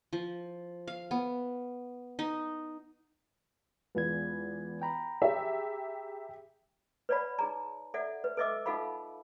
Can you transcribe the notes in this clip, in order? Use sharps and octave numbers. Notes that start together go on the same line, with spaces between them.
F3
F5
B3
D#4
E2 G#3 B3 F4 G#6
G5 A#5 B5
G4 G#4 E5
B4 C#5 D5 F#5 B5
D#4 G#4 A#5
A4 D5 E5 F#5
B4
A4 B4 D#5 E5 D6 E6
D#4 F4 A4 F5 F#5 B5